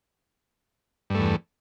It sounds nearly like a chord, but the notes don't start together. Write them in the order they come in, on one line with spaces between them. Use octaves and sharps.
G2 A3 E2